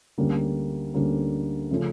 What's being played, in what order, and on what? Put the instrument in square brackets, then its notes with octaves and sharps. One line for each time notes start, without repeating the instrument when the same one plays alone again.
[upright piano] D2 D3 G3 A#3 C#4
D2 D3 G3 A#3 C#4
C#3 F3 A3 C#4